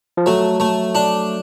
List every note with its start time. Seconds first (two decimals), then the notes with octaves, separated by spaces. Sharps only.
0.17 F3
0.26 F#3 A3
0.60 A3
0.95 D4